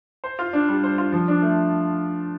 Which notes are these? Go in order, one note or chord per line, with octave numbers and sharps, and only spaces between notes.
C5
F4
D4
G3
C5
F4
F3
D4
A3